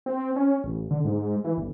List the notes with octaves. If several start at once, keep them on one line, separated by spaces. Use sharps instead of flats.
C4
C#4
A1
D3
G#2
E3
G1